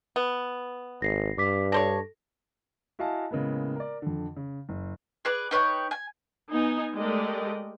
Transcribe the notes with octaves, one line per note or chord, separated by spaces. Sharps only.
B3
G#1 A#6 C7
G2 D6 B6
D4 A4 C5 C#5 A#6
E4 F#4 D#5 F5 G#5 A5
A2 C#3 G#3 A#3 B3
A#4 D5
F2 D3
C#3
F#1
G#4 B4 D5
D#4 B4 C#5 G5
G#5
B3 D#4 G#5
G#3 A3 G4 A#4 D5 D#5